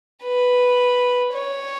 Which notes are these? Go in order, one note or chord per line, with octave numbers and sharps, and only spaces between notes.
B4
C#5